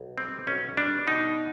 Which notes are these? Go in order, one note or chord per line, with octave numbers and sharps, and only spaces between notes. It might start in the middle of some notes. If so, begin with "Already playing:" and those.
Already playing: B1
G3 C4
B1 C#4
G3 D4
B2 D#4